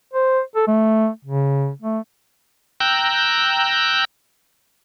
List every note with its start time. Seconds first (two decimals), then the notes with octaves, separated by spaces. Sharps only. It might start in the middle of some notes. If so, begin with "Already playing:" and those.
0.13 C5
0.56 A4
0.67 A3
1.25 C#3
1.82 A3
2.80 G5 A#5 E6 F#6 G6